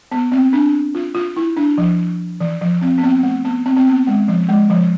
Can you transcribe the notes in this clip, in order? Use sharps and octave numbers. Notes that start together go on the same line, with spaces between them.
B3
C4
D4
F4
F4
E4
D4
F3
E3
F3
C4
B3
C4
A3
B3
C4
C4
B3
G#3
F3
G#3
F3